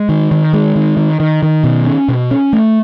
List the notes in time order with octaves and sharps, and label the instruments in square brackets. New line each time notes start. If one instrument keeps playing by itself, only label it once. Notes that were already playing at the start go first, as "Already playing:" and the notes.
Already playing: [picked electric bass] G#3
D#3
D#3
G#3
D#3
D#3
D#3
D#3
B2
C#4
B2
C#4
A3